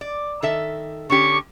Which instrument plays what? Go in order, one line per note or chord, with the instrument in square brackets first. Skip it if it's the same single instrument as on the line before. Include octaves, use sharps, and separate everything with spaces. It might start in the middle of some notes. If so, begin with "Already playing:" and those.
[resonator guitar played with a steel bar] D5
D#3 A4 E5
[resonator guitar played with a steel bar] D3 C#4 G4 [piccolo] C#6